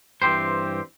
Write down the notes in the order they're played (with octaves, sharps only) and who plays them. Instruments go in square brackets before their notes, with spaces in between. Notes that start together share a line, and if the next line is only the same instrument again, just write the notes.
[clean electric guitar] G2 E3 C4 G4 C5